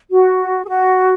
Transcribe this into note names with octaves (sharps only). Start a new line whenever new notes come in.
F#4
G#4
F#4